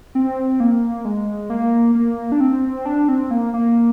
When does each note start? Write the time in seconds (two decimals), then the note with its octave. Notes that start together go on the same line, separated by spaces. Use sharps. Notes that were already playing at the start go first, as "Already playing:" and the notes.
0.15 C4
0.60 A#3
1.05 G#3
1.50 A#3
1.95 A#3
2.32 D4
2.40 C4
2.86 D4
3.09 C4
3.31 A#3
3.54 A#3